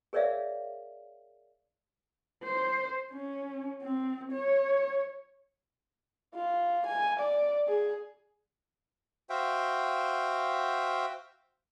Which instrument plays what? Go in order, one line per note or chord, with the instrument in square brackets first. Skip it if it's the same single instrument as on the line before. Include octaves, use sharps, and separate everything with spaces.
[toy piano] G#4 A#4 C#5 D5 E5 F5
[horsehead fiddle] C5
C#4
C4
C#5
[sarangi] F4
G#5
D5
G#4
[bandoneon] F#4 C5 E5 F5 G5